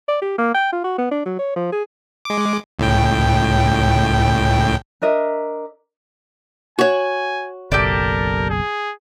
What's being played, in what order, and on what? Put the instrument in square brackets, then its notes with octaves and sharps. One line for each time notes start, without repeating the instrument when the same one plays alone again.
[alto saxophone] D5
G4
A#3
G5
F4
F#4
B3
D4
F#3
C#5
F3
G#4
[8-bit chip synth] G#3 D6
C#2 A2 G5
[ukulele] D4 A#4 D#5 E5
[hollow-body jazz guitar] F#4 C#5 [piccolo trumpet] G#5
[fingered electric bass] F#1 B1 [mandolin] G4 A4 D5 [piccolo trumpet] A#4
[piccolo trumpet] G#4